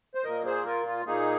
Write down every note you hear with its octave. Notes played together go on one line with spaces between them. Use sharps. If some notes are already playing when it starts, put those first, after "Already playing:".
C5
A#2 A#3 A#4 D#5
G#4 C5
F4 A#4
F4
A#2 A#3 D#4 G#4